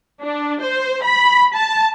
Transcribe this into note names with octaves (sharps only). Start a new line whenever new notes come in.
D4
C5
B5
A5